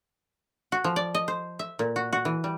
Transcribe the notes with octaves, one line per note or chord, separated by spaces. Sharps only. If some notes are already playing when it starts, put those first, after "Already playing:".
F#4
F3
D5
D#5
C5
E5
A#2
F#4
F#4
E3
G3